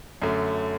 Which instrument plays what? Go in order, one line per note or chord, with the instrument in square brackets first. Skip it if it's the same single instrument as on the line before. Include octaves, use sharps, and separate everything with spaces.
[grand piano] F#2 D3 A3